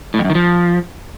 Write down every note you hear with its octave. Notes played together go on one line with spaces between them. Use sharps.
A2
F2
F#2
D#3
F3